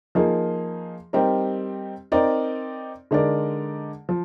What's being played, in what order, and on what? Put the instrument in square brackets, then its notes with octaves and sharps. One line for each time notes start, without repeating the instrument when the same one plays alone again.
[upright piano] F3 A#3 D#4 G#4
G3 C4 D#4 G4 A#4
C4 D#4 A#4 D5
D3 G#3 D#4 A#4 D5
F3